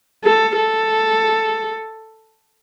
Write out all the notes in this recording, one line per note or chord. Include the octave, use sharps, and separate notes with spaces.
A4
A4